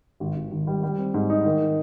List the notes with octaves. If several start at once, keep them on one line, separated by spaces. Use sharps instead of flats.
G#1
G#1
G#1
G3
G3
C4
G#2
D#4
D#3